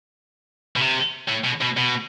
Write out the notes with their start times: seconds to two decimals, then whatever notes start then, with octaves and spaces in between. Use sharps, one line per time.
0.76 B2
0.81 C3
1.28 A2
1.45 B2
1.61 B2
1.77 B2